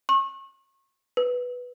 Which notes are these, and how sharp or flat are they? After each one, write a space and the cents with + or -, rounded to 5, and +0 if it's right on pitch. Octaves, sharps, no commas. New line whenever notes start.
C#6 -35
B4 -5